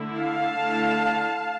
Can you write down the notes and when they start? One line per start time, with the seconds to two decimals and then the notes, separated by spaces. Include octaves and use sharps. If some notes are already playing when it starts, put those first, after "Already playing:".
Already playing: D3 A3 E4
0.18 F5 A5
0.55 D3 A3 E4